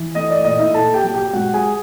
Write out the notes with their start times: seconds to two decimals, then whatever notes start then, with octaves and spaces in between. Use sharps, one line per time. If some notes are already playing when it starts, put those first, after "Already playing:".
Already playing: E3
0.15 A3 D#5
0.30 D5
0.45 A#2 D#5
0.60 E4 E5
0.74 A#2 A4 A5
0.94 G4 G5
1.04 F#3
1.14 G4 G5
1.33 G#3 F#4 F#5
1.54 G#4 G#5